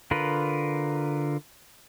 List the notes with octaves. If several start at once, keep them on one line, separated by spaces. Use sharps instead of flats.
D3 F4 A#4 B4